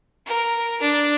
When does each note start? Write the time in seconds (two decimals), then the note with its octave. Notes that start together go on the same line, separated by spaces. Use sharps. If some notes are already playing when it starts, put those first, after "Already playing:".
0.26 A#4
0.81 D4